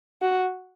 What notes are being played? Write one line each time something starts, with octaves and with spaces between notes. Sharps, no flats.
F#4